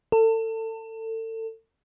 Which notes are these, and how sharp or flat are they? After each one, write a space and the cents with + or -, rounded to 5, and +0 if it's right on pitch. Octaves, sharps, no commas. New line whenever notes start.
A4 +30